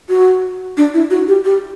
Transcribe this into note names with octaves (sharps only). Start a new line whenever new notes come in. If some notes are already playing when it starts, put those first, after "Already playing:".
F#4
D4
E4
F#4
G4
G4